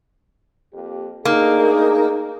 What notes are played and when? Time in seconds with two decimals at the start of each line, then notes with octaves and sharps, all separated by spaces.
0.73 F2 A#3 G4
1.25 A3 A#3 D4 D#4 G#4